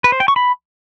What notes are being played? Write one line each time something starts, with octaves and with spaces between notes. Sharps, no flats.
B4
C5
G5
C#6
B5